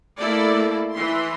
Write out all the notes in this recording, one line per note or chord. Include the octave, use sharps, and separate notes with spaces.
A3 A#3 E4 A4 D5
E3 C6